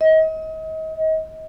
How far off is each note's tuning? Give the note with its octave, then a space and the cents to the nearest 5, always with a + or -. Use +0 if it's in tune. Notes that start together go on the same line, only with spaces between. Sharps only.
D#5 +35